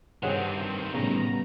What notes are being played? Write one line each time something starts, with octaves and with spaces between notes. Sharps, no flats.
G2 C3 D#3 C4 G#4 C#5 F#5
A2 C#3 G3 B3 A#5